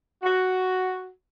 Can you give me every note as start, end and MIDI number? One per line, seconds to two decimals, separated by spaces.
0.23 1.08 66